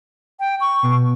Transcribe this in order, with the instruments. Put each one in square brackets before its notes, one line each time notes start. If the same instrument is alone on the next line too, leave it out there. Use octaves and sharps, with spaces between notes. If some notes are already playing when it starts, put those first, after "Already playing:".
[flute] G5
C#6
[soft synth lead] B2